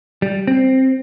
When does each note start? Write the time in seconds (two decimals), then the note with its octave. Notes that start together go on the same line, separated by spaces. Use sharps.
0.22 G3
0.47 C4